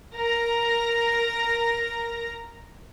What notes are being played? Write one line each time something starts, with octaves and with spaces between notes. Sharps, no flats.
A#4 A#5 A#6